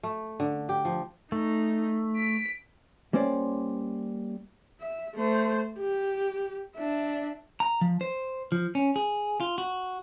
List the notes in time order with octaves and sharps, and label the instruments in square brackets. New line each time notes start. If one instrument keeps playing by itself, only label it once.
[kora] A3
D3
G4
F3
[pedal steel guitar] A3 [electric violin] D#4
[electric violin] B6 D7
[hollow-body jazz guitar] G3 A#3 C#4 C5 D5
[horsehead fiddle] E5
A3 C5
G4
D4 E5
[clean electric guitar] A#5
F3
C5
F3
C#4
G#4
F4
F#4